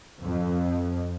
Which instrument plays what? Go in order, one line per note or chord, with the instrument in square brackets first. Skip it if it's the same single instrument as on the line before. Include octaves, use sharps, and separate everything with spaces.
[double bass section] F2